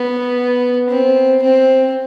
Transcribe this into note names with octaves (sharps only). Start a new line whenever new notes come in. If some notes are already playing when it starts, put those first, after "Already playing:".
Already playing: B3
C4
C4